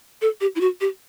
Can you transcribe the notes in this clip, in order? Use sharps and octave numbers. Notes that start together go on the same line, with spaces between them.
A4
G4
E4
F#4
G4